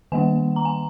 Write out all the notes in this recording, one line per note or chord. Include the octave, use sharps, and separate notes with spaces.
D#3 G3 A#3 G#5
A#5
G#5